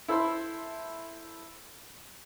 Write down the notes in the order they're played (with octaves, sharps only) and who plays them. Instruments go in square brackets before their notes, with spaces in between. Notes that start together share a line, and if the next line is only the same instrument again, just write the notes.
[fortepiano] E4 A4 C5 B5 C6